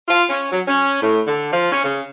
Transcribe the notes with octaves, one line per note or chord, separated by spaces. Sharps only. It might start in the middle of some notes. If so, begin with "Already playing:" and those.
F4
C#4
F#3
C#4
A2
D3
F3
C#4
C#3